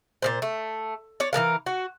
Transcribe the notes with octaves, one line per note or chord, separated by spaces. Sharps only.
A#2 C#3 C5
A3
C#5 D5
E3 B3 A#4 F5
F#4